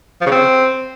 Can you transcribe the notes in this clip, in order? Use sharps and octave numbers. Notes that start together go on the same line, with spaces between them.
F3
C#3
C4